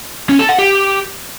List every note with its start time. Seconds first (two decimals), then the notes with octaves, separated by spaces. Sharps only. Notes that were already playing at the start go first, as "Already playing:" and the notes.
0.29 C#4
0.39 A4
0.49 F#5
0.59 G4